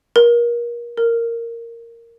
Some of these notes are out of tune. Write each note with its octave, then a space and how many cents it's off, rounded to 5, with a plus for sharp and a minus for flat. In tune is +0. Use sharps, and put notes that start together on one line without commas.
A#4 +30
A#4 -10